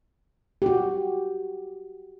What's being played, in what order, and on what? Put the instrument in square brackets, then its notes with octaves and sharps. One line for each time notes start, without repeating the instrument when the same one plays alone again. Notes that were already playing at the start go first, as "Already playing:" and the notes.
[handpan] F#4 G4